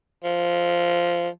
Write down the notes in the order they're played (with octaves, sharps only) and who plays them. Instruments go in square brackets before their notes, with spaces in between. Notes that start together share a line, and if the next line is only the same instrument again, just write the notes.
[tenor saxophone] F3